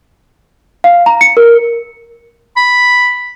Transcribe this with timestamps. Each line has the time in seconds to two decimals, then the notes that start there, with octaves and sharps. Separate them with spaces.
0.84 F5
1.06 A#5
1.21 C#7
1.37 A#4
2.57 B5